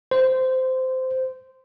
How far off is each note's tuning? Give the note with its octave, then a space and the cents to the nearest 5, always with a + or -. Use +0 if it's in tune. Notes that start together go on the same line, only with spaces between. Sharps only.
C5 -15